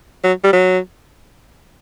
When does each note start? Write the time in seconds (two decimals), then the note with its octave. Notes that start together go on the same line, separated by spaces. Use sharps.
0.24 F#3
0.44 G3
0.53 F#3